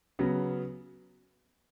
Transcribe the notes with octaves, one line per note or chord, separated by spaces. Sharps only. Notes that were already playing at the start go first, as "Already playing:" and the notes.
C#3 F#3 B3